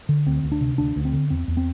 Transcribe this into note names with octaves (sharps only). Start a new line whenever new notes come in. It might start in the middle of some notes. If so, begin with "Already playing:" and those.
D3
D2 C4
D2
D4
C3
D2 D4
D2
C4
D3
E2 C4
E2
C4